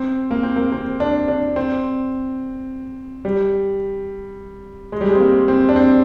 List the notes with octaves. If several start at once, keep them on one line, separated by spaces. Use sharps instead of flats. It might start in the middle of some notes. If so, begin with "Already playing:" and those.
Already playing: C4
A#3
C4
A#3
C4
D4
D4
C4
G3
G#3
G3
G#3
C4
A#3
C4
D4
C4